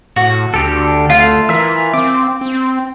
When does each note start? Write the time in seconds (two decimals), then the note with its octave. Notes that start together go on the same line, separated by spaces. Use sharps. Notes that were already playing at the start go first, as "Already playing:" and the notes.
0.16 A2 F#4
0.54 D2 D3 G4 A4
1.10 A3 F4
1.49 E3 A#4 E5 E6
1.94 C4 D6
2.41 C4